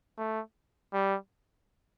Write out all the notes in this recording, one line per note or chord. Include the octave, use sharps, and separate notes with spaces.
A3
G3